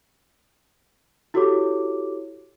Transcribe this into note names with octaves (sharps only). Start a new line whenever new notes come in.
E4 F#4 G4 A4 C#5 D6